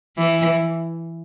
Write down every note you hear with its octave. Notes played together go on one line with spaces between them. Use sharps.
E3